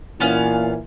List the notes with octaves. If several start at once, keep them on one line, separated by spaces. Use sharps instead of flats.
A#2 E3 A#3 B3 C#4 F5